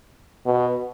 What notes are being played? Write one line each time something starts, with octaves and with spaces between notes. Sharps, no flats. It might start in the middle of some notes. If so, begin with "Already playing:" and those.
B2